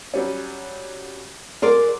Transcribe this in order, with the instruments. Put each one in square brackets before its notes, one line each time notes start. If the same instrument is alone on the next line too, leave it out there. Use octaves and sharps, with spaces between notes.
[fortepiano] F#3 G3 C#4
[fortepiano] F#3 C6 D6 [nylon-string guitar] G#4 A#4 D5